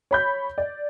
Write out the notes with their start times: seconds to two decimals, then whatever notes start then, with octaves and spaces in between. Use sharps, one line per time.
0.11 C#5 B5 G6
0.58 D5